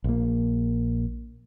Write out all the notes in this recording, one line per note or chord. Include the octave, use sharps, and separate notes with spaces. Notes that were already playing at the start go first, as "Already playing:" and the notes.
A#1 A#3